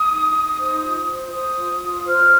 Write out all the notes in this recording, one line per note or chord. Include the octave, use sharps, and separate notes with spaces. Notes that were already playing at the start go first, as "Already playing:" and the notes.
Already playing: D#6
D#4
D#4
C5
F4
C5
C5 D#6
F4
F4
C5 F6